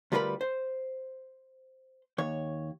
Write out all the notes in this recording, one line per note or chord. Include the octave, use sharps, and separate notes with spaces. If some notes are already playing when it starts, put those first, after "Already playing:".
D2 G3 F4 A#4 B4 B5
C5
D#2 C#5